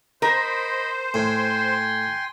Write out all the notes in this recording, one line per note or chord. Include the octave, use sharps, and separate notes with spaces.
A#4 C5 D#5 B5
A2 G5 G#5 C6